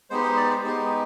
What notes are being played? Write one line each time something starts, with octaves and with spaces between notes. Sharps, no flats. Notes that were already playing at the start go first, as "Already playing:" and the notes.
G#3 B3 D#4 G4 C5
C5
D5
C5
G#3 B3 D#4 G4 C5